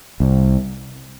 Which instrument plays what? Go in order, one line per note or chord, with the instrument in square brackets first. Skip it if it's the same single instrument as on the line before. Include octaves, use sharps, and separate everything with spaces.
[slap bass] C2